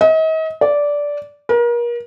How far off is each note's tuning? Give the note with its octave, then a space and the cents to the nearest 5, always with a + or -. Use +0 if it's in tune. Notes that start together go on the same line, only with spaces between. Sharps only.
D#5 +40
D5 -10
A#4 +35